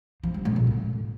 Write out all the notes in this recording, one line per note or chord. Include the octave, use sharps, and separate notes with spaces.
F3
G3
A2
A#2
A2